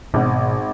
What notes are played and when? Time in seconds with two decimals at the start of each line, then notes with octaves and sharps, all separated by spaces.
0.14 G#1 G#2 B2